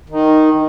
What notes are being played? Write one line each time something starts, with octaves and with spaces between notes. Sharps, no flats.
D#3